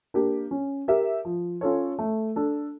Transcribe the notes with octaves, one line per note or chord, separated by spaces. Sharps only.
A#3 D4 G4
C#4
G4 A#4 E5
F3
C#4 F4 A4 C#5
A3
D4 A4